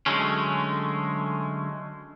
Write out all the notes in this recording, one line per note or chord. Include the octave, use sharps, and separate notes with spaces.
D3 F#3 G#3 A3 C#4